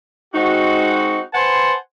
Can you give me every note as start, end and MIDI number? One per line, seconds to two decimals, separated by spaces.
0.34 1.19 56
0.34 1.19 60
0.34 1.19 63
0.34 1.19 66
1.34 1.73 71
1.34 1.73 72
1.34 1.73 78
1.34 1.73 80
1.34 1.73 81
1.34 1.73 84